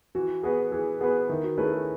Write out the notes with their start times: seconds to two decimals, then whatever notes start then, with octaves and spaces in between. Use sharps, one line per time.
0.15 E3 F#4
0.43 B3 F#4 G#4 B4
0.72 E3 G#4
1.01 B3 F#4 G#4 B4
1.29 D#3 E4
1.44 F#4
1.58 A3 C#4 E4 G#4 B4
1.73 G#4